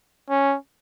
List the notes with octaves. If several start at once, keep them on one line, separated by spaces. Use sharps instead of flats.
C#4